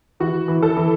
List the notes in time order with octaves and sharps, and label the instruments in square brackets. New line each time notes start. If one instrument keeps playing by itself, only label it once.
[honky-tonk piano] E3 F#4
E3
A4
E3